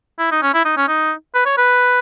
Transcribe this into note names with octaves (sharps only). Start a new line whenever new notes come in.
E4
D#4
C#4
E4
D#4
C#4
D#4
B4
C#5
B4